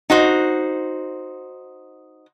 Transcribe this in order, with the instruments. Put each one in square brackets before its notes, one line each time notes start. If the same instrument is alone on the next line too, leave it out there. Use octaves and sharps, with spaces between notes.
[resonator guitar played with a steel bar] D#4 F#4 C5